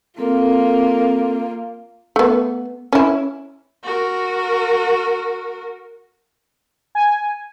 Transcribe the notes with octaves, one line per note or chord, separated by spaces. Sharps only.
A#3 C4 F4 A4 A#4
A3 B3
C#4 E4
F#4 A#4
G#5